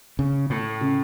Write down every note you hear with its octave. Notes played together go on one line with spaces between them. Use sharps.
C#3
A2
C#3